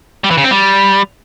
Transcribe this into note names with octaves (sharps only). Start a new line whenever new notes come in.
G3
E3
C#3
C4
G3